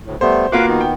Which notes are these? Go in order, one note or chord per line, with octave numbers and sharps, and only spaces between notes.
D2 A2
G3 A3 B3 C5
A#3 F4 F#4 B4 F5 D6
D#3 B3
G5